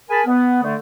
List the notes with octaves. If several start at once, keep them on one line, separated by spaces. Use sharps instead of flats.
G#4 A#4 G#5 A5 B5
B3
D3 A3